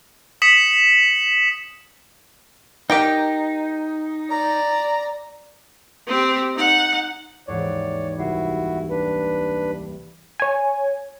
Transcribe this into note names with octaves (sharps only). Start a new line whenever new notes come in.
D#6 B6 C#7 E7 F#7
D#4 G4 A#4 G5
D5 A#5
C4 G4
D#4 F#5
D#2 G#2 E3 C#5 D5
C2 E4 F#4 C7
D4 B4
C#5 G#5